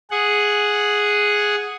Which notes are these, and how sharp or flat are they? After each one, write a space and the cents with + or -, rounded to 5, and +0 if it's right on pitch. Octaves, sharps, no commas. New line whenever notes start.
G#4 +0 F#5 -5